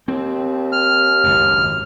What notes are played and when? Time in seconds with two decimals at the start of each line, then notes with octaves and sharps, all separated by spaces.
0.08 D#2 C4
0.72 F6
1.24 G#1 C#2 F#2